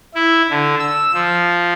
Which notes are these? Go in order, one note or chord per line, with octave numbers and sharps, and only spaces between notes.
E4
D3
E6
F3